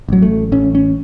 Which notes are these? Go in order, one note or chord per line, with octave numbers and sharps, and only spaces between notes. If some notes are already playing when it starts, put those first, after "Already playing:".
A1 F#3
A3
A1 C#4
C#4